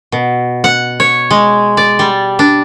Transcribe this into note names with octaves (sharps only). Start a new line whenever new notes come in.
B2
F#5
C#5
G#3
D5
G3
D4